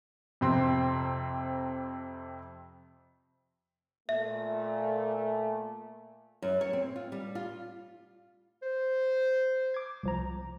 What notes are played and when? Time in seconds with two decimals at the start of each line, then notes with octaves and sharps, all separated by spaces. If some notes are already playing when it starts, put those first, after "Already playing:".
0.41 F2 C3 C4 C6
4.09 A#2 A3 E5
6.42 F#2
6.61 C#5
6.73 C4
6.96 F4
7.12 G3
7.35 F4
8.62 C5
9.74 D6 G#6
10.03 C2 F3 A#5